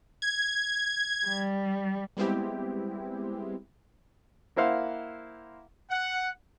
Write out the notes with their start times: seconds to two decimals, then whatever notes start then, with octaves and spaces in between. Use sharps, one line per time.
0.22 G#6
1.27 G3
2.17 G3 G#3 B3 C4 E4 G4
4.56 A#3 E4 C5 F5 F#5
5.90 F#5